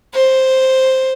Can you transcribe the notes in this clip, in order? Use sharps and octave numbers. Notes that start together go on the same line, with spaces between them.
C5